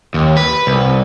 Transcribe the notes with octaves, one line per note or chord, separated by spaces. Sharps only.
D#2
B4
C2